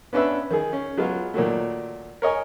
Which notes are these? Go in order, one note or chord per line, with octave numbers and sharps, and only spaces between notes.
B3 C#4 D4 B4 E5
D#3 G#4
C#4
F#3 G#3 B3 F4
A#2 D#3 F#3 A3
A#4 C#5 D#5 G#5